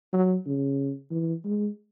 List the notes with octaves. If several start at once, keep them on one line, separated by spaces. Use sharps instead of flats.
F#3
C#3
E3
G#3